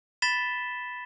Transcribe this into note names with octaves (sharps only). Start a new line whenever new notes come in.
B5 A6 B6 E7 G7